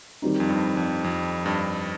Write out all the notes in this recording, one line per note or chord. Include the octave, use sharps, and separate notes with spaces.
D#3 G3 C4 D#4
F2
G2
F2
F2
G2